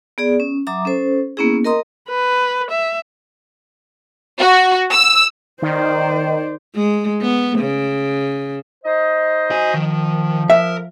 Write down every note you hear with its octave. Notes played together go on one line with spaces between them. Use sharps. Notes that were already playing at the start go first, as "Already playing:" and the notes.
B3 G#4 D5
C#4
F#3 E5 A#5 D6 D#6
C#4 A4 C5
A#3 B3 C#4 E4 G#4
A#4 D#5 A#5 C6 D#6
B4
E5
F#4
E6
D#3 C5 D5
G#3
B3
C#3
D#4 C5 D#5
F#4 G#5
D#3 F3
A#4 E5